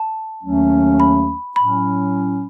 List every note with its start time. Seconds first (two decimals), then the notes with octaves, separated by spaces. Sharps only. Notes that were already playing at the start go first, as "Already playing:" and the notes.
Already playing: A5
0.43 D#2 D#3 F#3 A3 C#4
1.00 B5
1.56 A2 F#3 C#4 B5